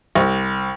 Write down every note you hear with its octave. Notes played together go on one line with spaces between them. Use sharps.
C2